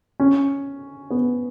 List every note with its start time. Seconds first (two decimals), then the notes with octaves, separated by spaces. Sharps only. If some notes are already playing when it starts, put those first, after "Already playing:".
0.20 C#4
1.11 B3